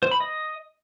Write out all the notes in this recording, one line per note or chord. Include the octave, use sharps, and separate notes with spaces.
C5
B5
D#5